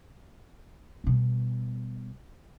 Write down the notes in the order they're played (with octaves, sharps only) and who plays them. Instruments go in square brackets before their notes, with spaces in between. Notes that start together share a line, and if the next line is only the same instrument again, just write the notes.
[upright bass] B2 G3